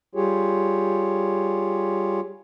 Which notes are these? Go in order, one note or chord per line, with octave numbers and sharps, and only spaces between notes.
G3 F4 G4 G#4 C#5